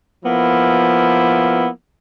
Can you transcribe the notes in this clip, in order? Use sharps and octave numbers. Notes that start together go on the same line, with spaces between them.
F3 A#3 B3 E4